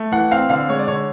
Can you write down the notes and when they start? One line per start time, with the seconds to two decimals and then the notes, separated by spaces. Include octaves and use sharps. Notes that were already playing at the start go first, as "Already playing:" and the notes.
Already playing: A3
0.12 E3 F#5
0.31 C4 F5
0.50 D3 F5
0.69 G#3 C#5
0.79 D5
0.88 D3 C#5